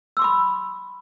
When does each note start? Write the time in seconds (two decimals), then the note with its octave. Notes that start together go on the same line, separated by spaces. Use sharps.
0.17 E6
0.19 C6
0.22 D6
0.24 B5